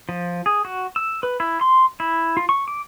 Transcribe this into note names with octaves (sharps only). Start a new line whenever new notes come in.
F3
G#4
F#4
E6
B4
E4
C6
E4
F4
C#6
D6